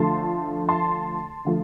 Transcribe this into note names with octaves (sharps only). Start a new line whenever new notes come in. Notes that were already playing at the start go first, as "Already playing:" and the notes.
Already playing: D3 F3 A3 A5 C6
A5 C6
D3 F3 A3